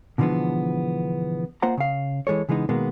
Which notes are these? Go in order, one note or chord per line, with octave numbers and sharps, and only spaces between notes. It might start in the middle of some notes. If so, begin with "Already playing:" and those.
B2 D3 E3 F3 G#3 B3
A#3 F4 C5 F#5 A#5
C#3 F5
E3 G#3 A4 C#5
C#3 E3 G#3 B3 D#4
B2 D#3 G#3 A#3 B3